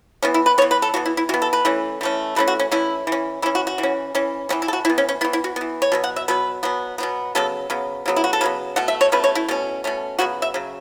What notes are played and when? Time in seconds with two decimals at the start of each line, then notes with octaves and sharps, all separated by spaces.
0.22 E3 B3 C#4
0.34 E4
0.46 B4
0.58 B3 C#5
0.62 E3
0.71 B4
0.82 A4
0.94 E3 B3 F#4
1.06 E4
1.17 E4
1.29 E3 B3 F#4
1.42 A4
1.53 B4
1.65 E3 A3 C#4
2.01 E3 A3 C#4
2.36 E3 A3 C#4 B4
2.48 F#4
2.59 C#4
2.71 E3 A3 C#4 E4
3.07 E3
3.12 C#4
3.42 E3 E4
3.46 C#4
3.55 F#4
3.67 F#4
3.78 E3
3.83 C#4
4.15 E3 C#4
4.49 E3 B3 C#4
4.62 E4
4.68 A4
4.73 F#4
4.85 E3 B3 E4
4.98 C#4
5.09 C#4
5.21 B3 E4
5.25 E3
5.33 E4
5.44 F#4
5.56 E3 B3
5.82 C#5
5.92 B2 F#3 B3
6.04 F#5
6.16 E5
6.28 B2 F#3 B3 B4
6.63 B2 F#3 B3
6.98 B2 F#3 B3
7.35 C#3 F#3 B3 A4
7.70 C#3 F#3 B3
8.06 C#3 F#3 B3
8.16 E4
8.24 F#4
8.33 A4
8.41 C#3 B4
8.44 F#3 B3
8.76 B2 A3 F#5
8.88 E5
9.01 C#5
9.12 B2 A3 C#4 B4
9.24 C#5
9.35 E4
9.48 B2 A3 C#4
9.84 B2 A3 C#4
10.19 C#3 F#3 B3 F#4
10.42 E5
10.54 C#3 F#3